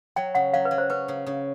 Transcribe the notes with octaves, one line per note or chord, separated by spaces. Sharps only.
F#3 G5
C#3 F#5
F#3 F5
B4
F#3
C5
C#4 B4
C#3
C#3